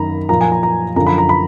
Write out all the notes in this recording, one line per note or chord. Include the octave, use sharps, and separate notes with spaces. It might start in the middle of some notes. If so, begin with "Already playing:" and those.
Already playing: F#2 D#3 A#5 B5
A#2 F3 A#5
G#5
A#5
A#5
F#2 D3 F3 A#5
B5
A#5
B5